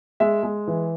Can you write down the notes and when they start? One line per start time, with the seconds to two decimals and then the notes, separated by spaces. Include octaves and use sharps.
0.20 G#3 E5
0.43 G#3
0.67 E3